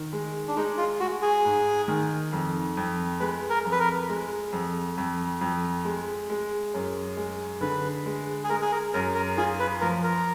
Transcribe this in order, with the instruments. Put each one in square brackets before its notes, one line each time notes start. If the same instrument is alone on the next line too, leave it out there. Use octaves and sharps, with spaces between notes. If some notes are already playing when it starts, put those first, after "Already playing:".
Already playing: [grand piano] D#3
G#3
[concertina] D4
[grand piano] G#3 [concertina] D#4
[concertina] F4
[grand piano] G#3 [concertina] F#4
[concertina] G#4
[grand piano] G#2
D#3
F2
F2
[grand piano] G#3 [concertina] B4
[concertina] A#4
[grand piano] F2
[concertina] B4
A#4
[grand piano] G#3
F2
F2
F2
G#3
G#3
F#2
G#3
[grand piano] D3 [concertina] B4
[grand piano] G#3
[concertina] G#4
[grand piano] G#3 [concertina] A#4
[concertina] G#4
A#4
[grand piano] F#2 [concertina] A#4
[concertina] A#4
[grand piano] F4 [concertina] G#4
[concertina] B4
[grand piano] F3 [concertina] A#4
[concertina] A#4